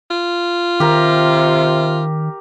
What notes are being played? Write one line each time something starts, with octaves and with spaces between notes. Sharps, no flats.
F4
C3 D#3 G4 A#4